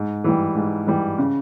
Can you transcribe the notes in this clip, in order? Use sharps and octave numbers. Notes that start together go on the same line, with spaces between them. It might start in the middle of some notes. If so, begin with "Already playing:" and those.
Already playing: G#2
E3 G3
G#2
E3 G3
C#3